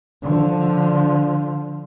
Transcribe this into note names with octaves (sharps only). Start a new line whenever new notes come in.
D3 F3